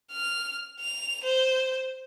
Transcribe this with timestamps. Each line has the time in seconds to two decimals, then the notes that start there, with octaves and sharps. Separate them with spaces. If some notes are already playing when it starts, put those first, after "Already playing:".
0.12 F6
0.80 F7
1.24 C5